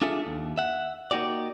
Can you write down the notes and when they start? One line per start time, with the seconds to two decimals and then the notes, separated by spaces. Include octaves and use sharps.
0.02 D4 F4 G#4 A4 E5
0.27 D#2
0.58 E5 F#5
1.11 A#3 D#4 F#4 G4 D5